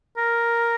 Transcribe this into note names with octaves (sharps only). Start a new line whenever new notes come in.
A#4